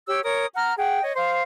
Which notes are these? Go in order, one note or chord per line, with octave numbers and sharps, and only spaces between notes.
G4 C#5 E6
A#4 C#5 D#6
F#5 A#5 F6
G#4 F#5 G5
C#5 D#5
C5 F5